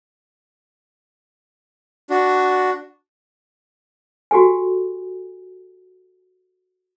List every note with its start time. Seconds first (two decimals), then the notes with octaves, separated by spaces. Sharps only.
2.10 D4 F#4
4.31 F#4 G4 A4 G#5